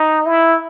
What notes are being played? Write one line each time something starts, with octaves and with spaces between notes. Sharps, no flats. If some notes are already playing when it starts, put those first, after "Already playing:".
Already playing: D#4
E4